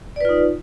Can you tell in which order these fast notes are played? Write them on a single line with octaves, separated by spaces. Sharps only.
D5 B4 F4 D#4